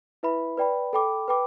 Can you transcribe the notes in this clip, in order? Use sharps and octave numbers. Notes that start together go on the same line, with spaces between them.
E4 B4 E5 B5
B4 D5 G5 B5
A4 G5 B5 D6
B4 G5 B5 D6